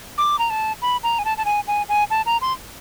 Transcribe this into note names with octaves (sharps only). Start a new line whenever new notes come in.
D6
A#5
A5
B5
A#5
G#5
A5
A5
G#5
G#5
G#5
A5
A#5
C6